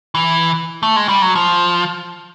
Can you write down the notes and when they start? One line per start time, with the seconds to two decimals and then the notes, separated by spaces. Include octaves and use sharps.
0.15 E3
0.83 A3
0.96 G#3
1.09 G3
1.22 F#3
1.35 F3